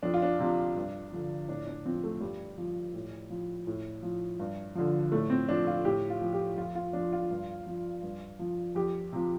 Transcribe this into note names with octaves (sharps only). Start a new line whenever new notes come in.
F2 D4
F4
D4
C3 F3
G2
D3 F3
A2 D4
D4
F3 C4
A3
G2 G3
F3
A2
F3
A2
F3
G2
D3 F3
A2 A3
C4
F3 D4
F4
A2 G4
F4
F3
G4
F2 F4
F4
F3 D4
F4
G2
F3
G2
F3
F2 G4
C3 F3